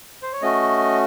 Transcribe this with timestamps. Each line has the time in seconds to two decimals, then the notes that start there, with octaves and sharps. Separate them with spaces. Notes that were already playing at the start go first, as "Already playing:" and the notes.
0.22 C5
0.33 C#5
0.42 A3 C#4 F#4 D#5